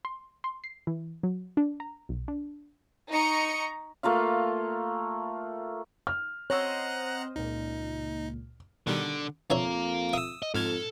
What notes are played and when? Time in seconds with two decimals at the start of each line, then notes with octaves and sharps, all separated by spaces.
0.05 C6
0.44 C6
0.64 C7
0.87 E3
1.23 F#3
1.57 D4
1.80 A#5
2.09 B1
2.28 D4
3.11 D#4 A#5 C#6 C#7
4.03 A3 A#3 F4 F5
6.07 F6
6.50 C4 C5 C#5 D#5 F#5 A#5 E6 F#6
7.36 C#2 A#2 D#4
8.87 B2 D3 D#3 G3
9.50 F2 D4 C#5 E5 F5 A#5
10.13 E5 D#6 E6
10.42 D#5
10.54 F2 G#2 A4 F6 G#6